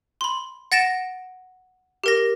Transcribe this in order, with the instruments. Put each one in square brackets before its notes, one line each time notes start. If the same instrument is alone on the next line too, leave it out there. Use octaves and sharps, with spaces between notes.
[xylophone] B5 C6
F#5 A6 A#6 D7 E7
G4 A#4 A#6